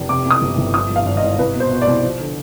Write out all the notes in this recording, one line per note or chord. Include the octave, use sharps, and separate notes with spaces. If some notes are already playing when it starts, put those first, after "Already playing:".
Already playing: F1
C3 D6
F2
D#6
G1
G1
F3 D#6
G2
F5
G#1
D#5
G#1
C2 B4
B2
C5
B2
D5
C2
F3
D3